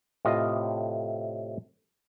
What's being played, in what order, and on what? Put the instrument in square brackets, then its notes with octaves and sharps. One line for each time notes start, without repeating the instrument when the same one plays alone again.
[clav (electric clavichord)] A2 C3 F4 D#5